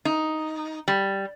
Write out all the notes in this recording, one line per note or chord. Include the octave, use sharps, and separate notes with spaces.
D#4
G3